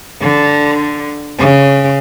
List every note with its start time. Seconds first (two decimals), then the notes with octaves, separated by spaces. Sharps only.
0.21 D3
1.38 C#3